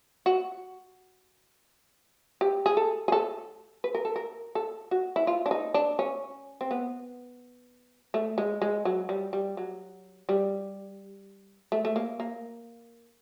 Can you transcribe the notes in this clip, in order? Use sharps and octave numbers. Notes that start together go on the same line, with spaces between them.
F#4
G4
G#4
A4
G#4
A4
B4
A#4
A4
A#4
A4
F#4
E4
F4
D4
D#4
D4
C#4
C4
B3
A3
G#3
G#3
F#3
G3
G3
F#3
G3
A3
A3
A#3
A#3